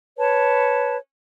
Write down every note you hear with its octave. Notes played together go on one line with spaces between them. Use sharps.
B4 C#5 A5